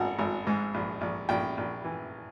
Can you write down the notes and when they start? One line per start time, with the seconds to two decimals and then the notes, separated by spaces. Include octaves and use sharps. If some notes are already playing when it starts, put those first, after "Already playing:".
Already playing: G#1 F#5
0.18 G#1
0.47 G#2
0.74 A#1
1.01 A#1
1.29 A#1 G5
1.57 A#1
1.84 E3